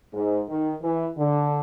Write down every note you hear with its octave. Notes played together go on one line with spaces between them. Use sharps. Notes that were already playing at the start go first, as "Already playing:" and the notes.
G#2
D#3
E3
D3